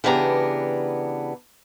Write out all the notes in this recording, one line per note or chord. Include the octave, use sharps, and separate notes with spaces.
C#3 E3 B3 D4 G4 A#5